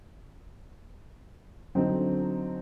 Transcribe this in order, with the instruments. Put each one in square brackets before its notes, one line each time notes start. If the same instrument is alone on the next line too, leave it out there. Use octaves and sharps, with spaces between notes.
[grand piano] D3 F#3 C4 D#4